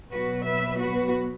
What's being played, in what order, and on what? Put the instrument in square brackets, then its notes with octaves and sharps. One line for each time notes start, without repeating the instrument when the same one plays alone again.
[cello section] B2 F#3 B3 F#4 B4
B4 E5
F#4 B4